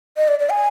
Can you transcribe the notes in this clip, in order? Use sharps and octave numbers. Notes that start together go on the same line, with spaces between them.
D#5
D5
D5
G#5